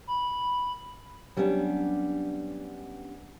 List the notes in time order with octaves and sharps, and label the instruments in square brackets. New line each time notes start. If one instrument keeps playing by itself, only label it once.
[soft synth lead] B5
[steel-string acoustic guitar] F#3 G3 B3 C#4 D4